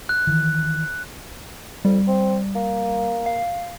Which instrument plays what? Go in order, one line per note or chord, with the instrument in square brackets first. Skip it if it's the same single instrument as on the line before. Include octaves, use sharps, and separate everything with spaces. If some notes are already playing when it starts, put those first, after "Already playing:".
[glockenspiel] F#6
[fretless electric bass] D#3 E3
[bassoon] F2 [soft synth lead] G3
[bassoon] C4
A#3
[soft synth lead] F5